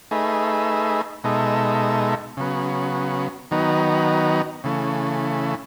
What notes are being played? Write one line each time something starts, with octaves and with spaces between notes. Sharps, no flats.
A3 D#4 G#4 B4 E5
B2 G#3 D#4 A4 E5
C#3 F#3 B3
D#3 F#3 B3 D#4
C#3 E3 A3